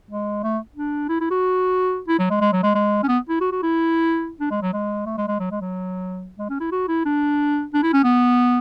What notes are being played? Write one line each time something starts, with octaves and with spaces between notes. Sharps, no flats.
G#3
A3
D4
E4
E4
F#4
E4
F#3
G#3
G#3
F#3
G#3
G#3
C#4
B3
E4
F#4
F#4
E4
D4
G#3
F#3
G#3
A3
G#3
G#3
F#3
G#3
F#3
G#3
C#4
E4
F#4
E4
D4
D4
E4
C#4
B3